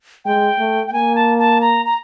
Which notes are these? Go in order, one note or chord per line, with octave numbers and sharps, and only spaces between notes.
G#3 G5
A3
G5
A#3 G#5
A5
A5
A#5
A#5